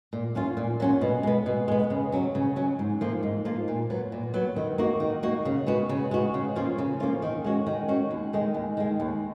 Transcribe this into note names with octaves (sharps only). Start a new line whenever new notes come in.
A#2
F#3 C#4 F4
A#2
F#3 C#4 F4
B2
G#3 B3
B2
G#3 B3
C#3
F#3 C#4
C#3
F#3 C#4
G#2
F3 A#3 F4
G#2
F3 A#3 F4
A#2
F#3 B3
A#2
F#3 B3
D#3
A#3 D#4 F#4
D#3
A#3 D#4 F#4
C#3
G#3 B3 F#4
C#3
G#3 B3 F#4
C#3
F3 A#3 C#4 F4
C#3
F3 A#3 C#4 F4
D#3
G#3 C#4 F#4
D#3
G#3 C#4 F#4
D#2
D#3 G#3
D#2
D#3 G#3
D#2